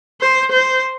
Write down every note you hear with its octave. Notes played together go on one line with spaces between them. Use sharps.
C5
C5